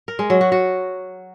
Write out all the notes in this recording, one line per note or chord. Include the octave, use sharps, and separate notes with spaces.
A#4
G#3
F#3
F#4
F#4